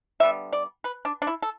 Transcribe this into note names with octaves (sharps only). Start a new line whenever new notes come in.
D3 G3 B3 E5
D5
B4
D4
D4
E4
A4